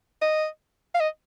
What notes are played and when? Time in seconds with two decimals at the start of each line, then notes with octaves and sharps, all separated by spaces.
0.22 D#5
0.95 F5
1.00 D#5